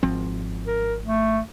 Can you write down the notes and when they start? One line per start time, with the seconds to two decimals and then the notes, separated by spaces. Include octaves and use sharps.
0.03 G#1 F3 C4
0.67 A#4
1.06 A3